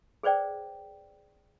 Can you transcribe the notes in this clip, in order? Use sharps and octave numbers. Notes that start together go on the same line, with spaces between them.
G#4 B4 C5 D5 G5